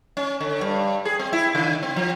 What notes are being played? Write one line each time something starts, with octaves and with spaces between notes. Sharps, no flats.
C#4
D3
G2
G#4
C4
E4
C#3
C4
F3